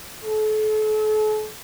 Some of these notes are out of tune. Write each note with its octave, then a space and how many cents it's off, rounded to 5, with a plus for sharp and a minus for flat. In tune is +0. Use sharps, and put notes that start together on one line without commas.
A4 -40